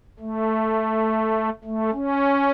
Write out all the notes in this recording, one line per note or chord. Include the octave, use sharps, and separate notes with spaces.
A3
A3
C#4